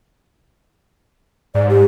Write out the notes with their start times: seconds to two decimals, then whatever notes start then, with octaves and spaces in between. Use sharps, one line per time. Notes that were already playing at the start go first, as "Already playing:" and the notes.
1.55 G#2 D5
1.69 G4